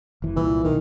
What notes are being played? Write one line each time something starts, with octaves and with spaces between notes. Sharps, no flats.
F1 E3
C2 A#2 E3
B1 D#3 E3